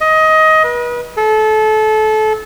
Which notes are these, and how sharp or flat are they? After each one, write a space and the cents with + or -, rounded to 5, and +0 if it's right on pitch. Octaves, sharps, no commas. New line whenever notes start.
D#5 +20
B4 -35
A4 -25